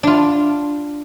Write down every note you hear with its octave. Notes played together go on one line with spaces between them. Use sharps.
D4 F4